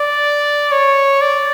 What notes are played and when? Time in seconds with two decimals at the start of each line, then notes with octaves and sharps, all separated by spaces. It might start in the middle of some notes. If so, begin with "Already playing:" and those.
Already playing: D5
0.72 C#5
1.21 D5